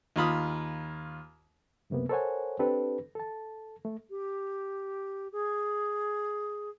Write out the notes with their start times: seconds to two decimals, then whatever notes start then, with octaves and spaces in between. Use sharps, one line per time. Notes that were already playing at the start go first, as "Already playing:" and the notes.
0.16 D#2 F4 B5 D#6
1.90 C#2 F#2 C3 A#3 B3
2.09 A4 A#4 C5 C#5 F#5 G#5
2.59 C4 D4 G4 A4 B4
3.15 A4 A5
3.85 A3
4.10 G4
5.32 G#4